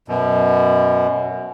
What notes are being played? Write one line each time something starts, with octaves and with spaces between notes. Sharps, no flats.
F#2 B2